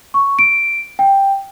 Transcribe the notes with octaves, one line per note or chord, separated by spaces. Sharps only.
C#6
D7
G5